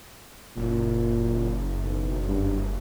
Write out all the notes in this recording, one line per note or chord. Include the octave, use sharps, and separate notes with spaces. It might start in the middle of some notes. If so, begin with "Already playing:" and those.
F#1 A#2
B1
G2